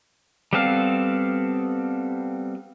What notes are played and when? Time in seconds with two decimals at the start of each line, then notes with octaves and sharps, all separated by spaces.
0.53 G3 B3 C4 A4 F5